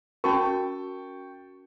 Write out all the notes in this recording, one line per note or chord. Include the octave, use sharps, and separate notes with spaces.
C#4 F#4 A#4 G5 A5 C#6